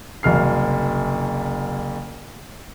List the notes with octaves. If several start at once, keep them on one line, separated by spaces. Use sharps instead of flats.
F#1 C2 F6 C7